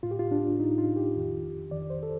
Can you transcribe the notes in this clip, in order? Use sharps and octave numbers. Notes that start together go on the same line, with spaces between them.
A2 F4
G4
F4
D4
A2 D#4
F4
G4
F2 D#3
F2 D#3 D5
C5
A4